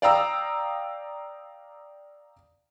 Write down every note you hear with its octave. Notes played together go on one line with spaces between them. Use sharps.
D5 F5 G5 A#5 D#6 E6